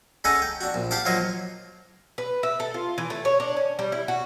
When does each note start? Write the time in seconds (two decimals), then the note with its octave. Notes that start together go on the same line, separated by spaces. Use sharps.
0.24 G#3 C#4 D#4 A4 D#5 F#5
0.42 G5
0.61 D4 F#4
0.74 A#1
0.91 G4 F5 F#5 A5 D6
1.05 F3 F#3 A#3 F4 C#5 D#5
2.18 B4
2.43 E5
2.60 A4
2.74 F4
2.98 E3
3.10 A3
3.25 C#5
3.40 D4
3.57 C#4
3.79 G3
3.92 E4
4.08 F#4